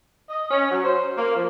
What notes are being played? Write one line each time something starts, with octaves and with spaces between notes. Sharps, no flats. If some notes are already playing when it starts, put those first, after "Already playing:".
D#5
C#4
F#3
C5
A#3
F3